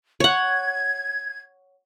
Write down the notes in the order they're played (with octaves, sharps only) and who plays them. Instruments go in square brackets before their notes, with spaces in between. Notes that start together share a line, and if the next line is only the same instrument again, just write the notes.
[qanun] C#5 F#5 [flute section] G#6